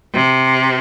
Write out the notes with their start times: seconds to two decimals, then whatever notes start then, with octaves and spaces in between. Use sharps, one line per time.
0.14 C3